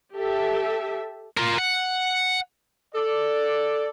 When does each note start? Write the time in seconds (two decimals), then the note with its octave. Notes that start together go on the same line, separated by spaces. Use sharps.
0.15 G4 A4 E5
1.37 F4 A#4
1.58 F#5
2.95 A4 D5